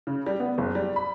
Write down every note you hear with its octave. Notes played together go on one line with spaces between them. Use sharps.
C#3
G3
B3
F#1
G3
B5